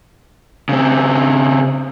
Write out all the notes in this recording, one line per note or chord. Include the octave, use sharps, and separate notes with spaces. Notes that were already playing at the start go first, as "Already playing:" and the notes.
C#3 C4